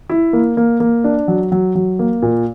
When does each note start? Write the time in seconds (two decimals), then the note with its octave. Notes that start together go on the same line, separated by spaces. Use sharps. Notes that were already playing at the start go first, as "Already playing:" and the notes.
0.09 E4
0.33 A#3
0.57 A#3
0.80 A#3
1.04 D4
1.28 F#3
1.52 F#3
1.75 F#3
1.99 A#3
2.22 A#2